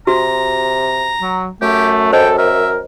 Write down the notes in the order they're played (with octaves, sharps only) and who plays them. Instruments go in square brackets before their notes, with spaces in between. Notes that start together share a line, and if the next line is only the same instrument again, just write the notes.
[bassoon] C3 [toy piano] F#4 [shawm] A#5
[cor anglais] F#3
[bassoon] F#2 [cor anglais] A3 [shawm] G4
[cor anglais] A4 [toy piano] C5 D#5 [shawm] G5
[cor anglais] A#4 [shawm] E5